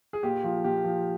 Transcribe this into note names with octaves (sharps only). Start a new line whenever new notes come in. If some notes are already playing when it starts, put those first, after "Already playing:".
G#4
A#2 G4
F3
A#2 G4
F3